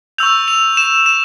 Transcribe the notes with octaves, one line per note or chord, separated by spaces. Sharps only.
C#6 E6 G6 F7
F7
E7
E7